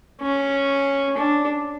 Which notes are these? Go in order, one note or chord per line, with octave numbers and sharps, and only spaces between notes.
C#4
D4